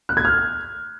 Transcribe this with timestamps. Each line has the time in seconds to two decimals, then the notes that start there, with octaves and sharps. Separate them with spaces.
0.09 F#6
0.17 G#6
0.25 F6